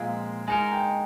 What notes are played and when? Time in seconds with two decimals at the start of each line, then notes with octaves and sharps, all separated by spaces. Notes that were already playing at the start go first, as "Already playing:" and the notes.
Already playing: A#2 F3 G#3 C4 F5
0.48 G#3 D#4 A#4 G#5
0.72 G5